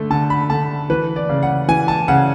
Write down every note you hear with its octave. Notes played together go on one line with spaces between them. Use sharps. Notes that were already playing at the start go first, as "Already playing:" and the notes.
Already playing: D3 A3
D3 A5
B5
D3 A5
E3 B4
D5
C#3
F#5
E3 G#5
A5
C#3 F#5